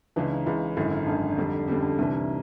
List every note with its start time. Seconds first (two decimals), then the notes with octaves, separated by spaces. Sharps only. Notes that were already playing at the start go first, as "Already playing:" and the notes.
0.16 C#2 C#3 E3 D4
0.31 D#4
0.46 C#2 C#3 E3 E4
0.77 G#1 F#2 D3 E4
0.92 D#4
1.07 G#1 F#2 D3 D4
1.19 D#4
1.30 D4
1.37 F2 D3 G3
1.68 F2 D3 G3 C#4
1.83 D4
1.99 C2 C3 E3 D4
2.13 D#4